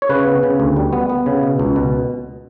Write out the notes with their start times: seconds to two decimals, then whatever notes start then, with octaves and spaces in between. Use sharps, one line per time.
0.02 C#5
0.09 C#3 B4
0.26 B3
0.43 C#3
0.60 D2
0.76 G3
0.93 B3
1.10 B3
1.26 C#3
1.43 B2
1.59 C#2
1.76 B2